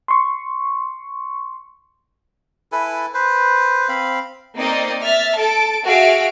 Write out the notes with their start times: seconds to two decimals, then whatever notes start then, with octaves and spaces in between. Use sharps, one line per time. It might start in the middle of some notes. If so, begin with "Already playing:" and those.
0.08 C6 C#6
2.72 E4 A4 B4 G#5
3.14 B4 C5
3.89 C4 F5 B5
4.56 A#3 C4 D#4 D5 D#5
5.02 E5 F6 A6
5.37 A4 A5 D7
5.85 F#4 G#4 E5 F5 F6 D7